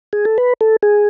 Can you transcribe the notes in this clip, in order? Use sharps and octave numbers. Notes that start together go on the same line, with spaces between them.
G#4
A4
B4
A4
G#4